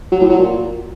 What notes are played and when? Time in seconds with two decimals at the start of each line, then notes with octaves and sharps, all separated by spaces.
0.12 F#3
0.21 A2
0.29 F#3
0.38 A#2